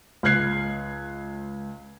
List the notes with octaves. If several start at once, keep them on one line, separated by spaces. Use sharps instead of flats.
C#2 F6 F#6 G#6 C7